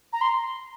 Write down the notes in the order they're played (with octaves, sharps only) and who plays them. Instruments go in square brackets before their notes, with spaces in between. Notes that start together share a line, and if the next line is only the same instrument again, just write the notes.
[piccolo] A#5
C6